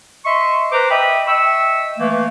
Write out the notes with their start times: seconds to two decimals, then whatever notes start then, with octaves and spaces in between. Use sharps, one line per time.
0.25 D#5 E5 C6 C#6
0.71 B4 C5 A#5 D6
0.90 D#5 E5 G5 B5 D6 D#6
1.27 D#5 E5 G5 C#6 E6
1.98 E3 A3 A#3